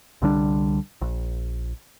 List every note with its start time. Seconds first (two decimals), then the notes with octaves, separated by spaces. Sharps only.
0.22 C2 D3 G3 D4
1.01 A#1